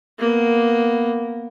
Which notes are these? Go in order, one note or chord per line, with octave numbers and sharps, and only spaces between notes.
A#3 B3